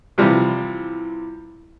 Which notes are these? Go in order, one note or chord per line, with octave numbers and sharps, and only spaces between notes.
C3 E3 F3 G3